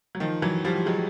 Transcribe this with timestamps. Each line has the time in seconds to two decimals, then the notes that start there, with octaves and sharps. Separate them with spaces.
0.15 F#3
0.20 D#3 F3
0.42 E3 F#3
0.65 F3 G3
0.86 F#3 G#3